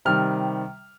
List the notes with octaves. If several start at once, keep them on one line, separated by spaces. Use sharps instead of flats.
C3 D#3 G3 F6